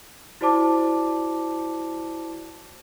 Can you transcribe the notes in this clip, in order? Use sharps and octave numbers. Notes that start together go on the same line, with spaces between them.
E4 F#4 C5 D5 A5 D6